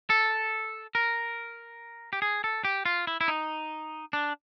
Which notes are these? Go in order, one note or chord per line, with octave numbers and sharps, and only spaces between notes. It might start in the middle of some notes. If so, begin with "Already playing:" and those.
A4
A#4
G4
G#4
A4
G4
F4
E4
E4
D#4
D4